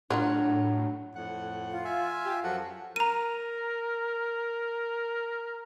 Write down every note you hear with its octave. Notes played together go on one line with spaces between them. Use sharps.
A2 F#3 D4 F4 A#4 C#5
F2 A2 F#5
F4
E5 G#5
G4
F#2 F3 F#4 A4 F#5
A#4 A#5 D#7